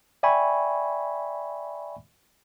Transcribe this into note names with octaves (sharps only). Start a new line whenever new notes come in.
D5 E5 G5 G#5 B5 C#6